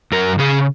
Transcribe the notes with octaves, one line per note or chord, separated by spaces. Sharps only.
F#2 A#4
C#3 G#4